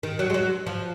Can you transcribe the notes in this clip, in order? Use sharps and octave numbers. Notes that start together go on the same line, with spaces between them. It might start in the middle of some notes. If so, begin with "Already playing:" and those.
D#3
F#3
G#3
F#3
F3